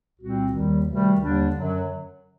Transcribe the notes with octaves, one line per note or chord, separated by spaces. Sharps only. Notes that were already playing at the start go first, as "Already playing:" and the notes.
C2 A#2 G3 C4 F#4
D#2 D#3 G3
D2 C3 D#3 G3
D#2 D3 G3 D4
F#2 D3 F#3